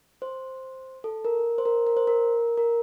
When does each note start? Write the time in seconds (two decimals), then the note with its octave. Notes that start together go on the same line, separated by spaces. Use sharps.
0.22 C5
1.04 A4
1.25 A#4
1.58 C5
1.65 A#4
1.87 A#4
1.97 C5
2.07 A#4
2.57 A#4